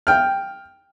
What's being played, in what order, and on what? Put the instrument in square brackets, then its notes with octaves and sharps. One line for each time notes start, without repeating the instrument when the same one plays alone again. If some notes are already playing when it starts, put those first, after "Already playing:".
[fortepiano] G5 F6